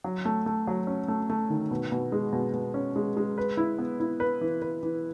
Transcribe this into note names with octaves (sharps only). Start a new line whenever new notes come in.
F#3
A3
A3
F#3
C#4
A3
A3
D#3
B2
B2
G#3
B2
B2
C#4
G#3
G#3
B4
E4
B3
E4
B4
E3
B4
E3